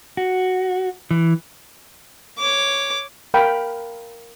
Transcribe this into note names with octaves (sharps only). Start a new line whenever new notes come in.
F#4
E3
C#5 D6
A#4 F5 G5 B5